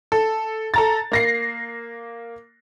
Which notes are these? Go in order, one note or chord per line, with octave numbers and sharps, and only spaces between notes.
A4
A4 A#5 A6
A#3 A#6 C7